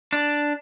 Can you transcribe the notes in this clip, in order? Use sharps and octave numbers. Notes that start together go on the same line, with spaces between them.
D4